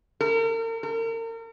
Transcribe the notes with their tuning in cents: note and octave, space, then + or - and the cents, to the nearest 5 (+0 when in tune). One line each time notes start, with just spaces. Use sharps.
A#4 -40
A#4 -35